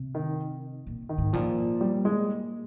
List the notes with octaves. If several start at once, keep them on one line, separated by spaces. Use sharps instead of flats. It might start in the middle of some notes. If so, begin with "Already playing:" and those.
Already playing: C3
D#3
A#2
D#3
G#2
A#2 F3
G3
G#3